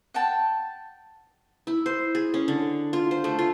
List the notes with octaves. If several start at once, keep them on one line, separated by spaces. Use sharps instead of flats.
F#5 G5 A5
E4
C5
G#4
C#4
D3
F4
C5
A3
F4